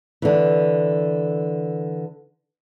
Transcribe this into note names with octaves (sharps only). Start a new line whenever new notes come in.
D3 E3